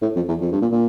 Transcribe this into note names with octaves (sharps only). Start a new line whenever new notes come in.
A2
F2
E2
F2
G2
A#2
A#2